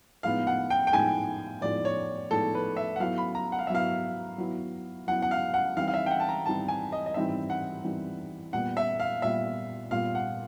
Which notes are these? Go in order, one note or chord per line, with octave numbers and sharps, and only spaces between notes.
A2 F3 G#3 B3 D#4 F5
F#5
G5
G5
A2 F3 G#3 B3 D#4 G#5
A2 F3 G#3 B3 D#4 D5
C#5
A2 F3 G#3 B3 D#4 A4
B4
E5
F#5
F#3 B3 E4 F5
B5
A#5
F#5
F5
E5
F#3 B3 E4 F5
F#3 B3 E4
F#3 B3 E4 F#5
F#5
F5
F#5
E3 G3 C4 D#4 F5
F5
E5
G5
F#5
A5
A#5
E3 G3 C4 D#4 A5
G#5
D#5
D#5
E3 G3 C4 D#4 E5
F#5
E3 G3 C4 D#4
A#2 G3 B3 F#5
E5
F5
A#2 G3 B3 E5
A#2 G3 B3 F5
F#5